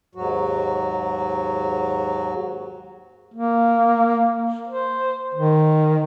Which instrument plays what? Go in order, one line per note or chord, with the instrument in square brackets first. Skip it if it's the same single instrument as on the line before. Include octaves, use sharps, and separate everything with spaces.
[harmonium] D#2 G#2 F#3 F#4
[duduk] A#3
C5
D#3